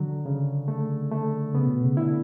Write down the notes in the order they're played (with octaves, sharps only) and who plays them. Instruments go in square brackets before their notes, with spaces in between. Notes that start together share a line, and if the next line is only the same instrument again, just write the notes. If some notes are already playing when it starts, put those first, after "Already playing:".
Already playing: [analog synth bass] D3 [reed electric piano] F#3
[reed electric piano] C#3
A3
A3
[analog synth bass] C#3 [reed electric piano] B3
[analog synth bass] B2
C#3
[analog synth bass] D3 [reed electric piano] E4